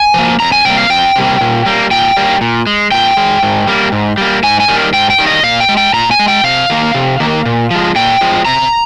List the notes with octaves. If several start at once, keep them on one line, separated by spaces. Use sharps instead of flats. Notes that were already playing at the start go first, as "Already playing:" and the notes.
Already playing: G#5
F3 A#3
F2 A#5
G#5
C3 G3 A#3 G5
F5
F2 G5
C3 G3 A#3
A#2
G3 A#3
A#2 G5
G3 A#3
A#2
G#3
A#2 G5
G#3
G#2
G3 A#3
G#2
G3 A#3
G#2 G#5
G#5
D#3 G3 A#3
G#2 G5
G5
D#3 G3 A#3
D#5
A#2 F5
G5
G#3
G5
A#2 A#5
G#5
G#3
G5
C3 F5
D#3 A#3
C3
D#3 A#3
A#2
F3 G#3
A#2 G5
F3 G#3
C3 A#5